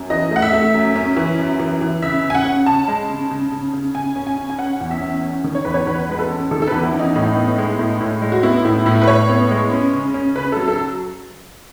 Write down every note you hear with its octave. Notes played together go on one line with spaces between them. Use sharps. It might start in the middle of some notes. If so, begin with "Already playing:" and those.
Already playing: F#2
E3 D#5
A3 F#5
E5
A3
F#2
C#4
E3
F#2
E3
E3
C#3 E5
C#3
G#5
F#5
C#4
C#3 A5
G#3
C#3
C#3
C#3
C#3
C#3 G#5
C#4
G#5
C#3
G#5
C#4 F#5
E2
E5
C#4
C#4
D#3
C#5
E2 B4
C#5
E2 B4
G#3 B4
A4
C#4
D#3 A4
A4
E2 B4
E4
C#4
D#4
A2
B3
G#3
A2
A2
G#3
F#4
B3 E4
A2 E4
A2 E4
B4
A2 C#5
B3
G#3
C#4
C#3
C#4
C#3 B4
F#3 A4
A4